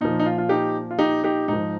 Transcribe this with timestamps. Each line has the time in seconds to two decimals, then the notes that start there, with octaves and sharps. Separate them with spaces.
0.01 A#2 F3 D#4
0.19 D#4
0.26 F4
0.38 F4
0.49 D#4 G4
0.91 F4
0.99 D#4 G4
1.24 D#4 G4
1.48 G#2 F3 D#4